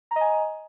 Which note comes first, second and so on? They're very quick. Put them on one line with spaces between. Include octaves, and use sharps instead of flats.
A#5 D#5 G#5